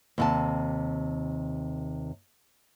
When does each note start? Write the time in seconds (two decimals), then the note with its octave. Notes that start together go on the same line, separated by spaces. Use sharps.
0.18 D#2 C3 A5